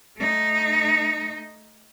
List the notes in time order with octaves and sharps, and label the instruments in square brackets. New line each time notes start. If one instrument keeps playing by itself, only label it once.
[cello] A3 D#4